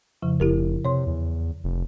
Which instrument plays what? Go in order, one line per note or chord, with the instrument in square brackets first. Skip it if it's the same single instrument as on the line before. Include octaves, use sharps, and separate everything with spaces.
[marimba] F2 C#3 F3
[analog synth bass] F1 [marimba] E4 G4 A#4
[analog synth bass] C3 [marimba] C#5 C6
[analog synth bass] E2
F1